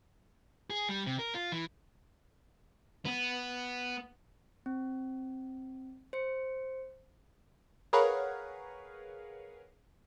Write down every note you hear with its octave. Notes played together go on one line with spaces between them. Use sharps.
G#4
G3
C3
A#4
F4
E3
B3
C4
C5 C#7
G#4 A#4 B4 C#5 F5 F#5